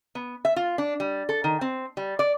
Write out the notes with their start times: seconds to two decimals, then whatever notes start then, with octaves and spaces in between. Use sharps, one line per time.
0.15 B3
0.45 E5
0.56 F4
0.78 D4
1.00 G3
1.29 A4
1.44 D#3
1.61 C4
1.97 G3
2.19 D5